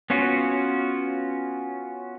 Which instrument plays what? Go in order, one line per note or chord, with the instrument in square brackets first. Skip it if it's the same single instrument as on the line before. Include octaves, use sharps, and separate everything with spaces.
[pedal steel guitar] B3 C#4 F4 F#4